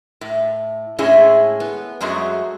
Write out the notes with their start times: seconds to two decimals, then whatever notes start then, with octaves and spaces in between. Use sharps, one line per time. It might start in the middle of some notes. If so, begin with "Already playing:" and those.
0.21 A2
0.99 A2 G#3 C#4 E4 G#4
1.60 B3
2.01 F#2 F#3 G#3 A3 F#4 G#4